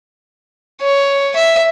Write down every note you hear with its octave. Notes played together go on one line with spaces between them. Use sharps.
C#5
E5